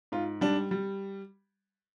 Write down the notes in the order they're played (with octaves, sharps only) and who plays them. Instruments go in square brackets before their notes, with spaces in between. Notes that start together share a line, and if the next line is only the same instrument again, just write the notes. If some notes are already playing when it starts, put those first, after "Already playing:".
[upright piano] G#2 F4
G3 D4
G3